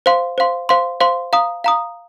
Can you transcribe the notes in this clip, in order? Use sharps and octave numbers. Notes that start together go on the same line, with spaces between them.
C5 F5 C6
C5 F5 C6
C5 F5 C6
C5 F5 C6
F5 A#5 D#6
F5 A#5 D#6